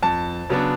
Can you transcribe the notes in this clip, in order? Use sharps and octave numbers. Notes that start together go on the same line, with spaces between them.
F2 A5
C#3 F#3 B3 D4